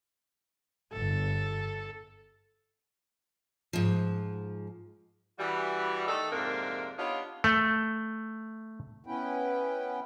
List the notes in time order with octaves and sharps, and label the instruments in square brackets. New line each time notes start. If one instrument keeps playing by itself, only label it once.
[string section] G1 [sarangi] A4
[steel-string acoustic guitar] G#2 F3
[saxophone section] E3 G3 F#4
D#3 A3 D#4 A4
F2 G#2 C3 A#3 D4 A#4
B3 D4 D#4 F4 G4 C#5
[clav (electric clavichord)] A3
[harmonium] B3 C#4 E4 B4 G5